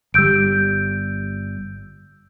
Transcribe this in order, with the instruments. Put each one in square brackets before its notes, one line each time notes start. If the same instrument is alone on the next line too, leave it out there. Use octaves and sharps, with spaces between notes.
[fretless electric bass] G1 G3 [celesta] E6 G6 D7